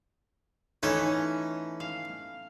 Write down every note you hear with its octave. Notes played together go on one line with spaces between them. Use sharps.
E3 A3 C#4 D#4
F5